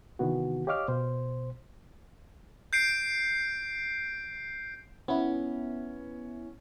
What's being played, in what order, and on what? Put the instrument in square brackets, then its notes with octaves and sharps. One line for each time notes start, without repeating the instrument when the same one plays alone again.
[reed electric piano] C3 D#3 E3 B3 F#4
G4 C#5 D#5 F5 D6 F6
B2 C5
[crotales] G6 C7 D7
[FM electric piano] B3 E4 [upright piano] C#4